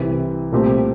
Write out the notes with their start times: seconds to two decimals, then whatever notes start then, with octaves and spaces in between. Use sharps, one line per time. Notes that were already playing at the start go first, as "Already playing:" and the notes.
Already playing: C2 C3 E3
0.52 C2 A#2 A3 C4 G4